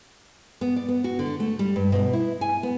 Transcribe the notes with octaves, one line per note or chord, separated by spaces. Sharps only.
B3
D5
B3
F#4
D3
A3
G3
G2
B2
E4
G#5
B3